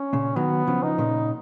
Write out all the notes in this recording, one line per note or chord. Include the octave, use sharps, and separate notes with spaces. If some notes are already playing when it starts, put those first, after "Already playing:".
Already playing: C#4
A#2 C#3
D#3 F#3 B3
C#3 F3
D#4
A#2 C#3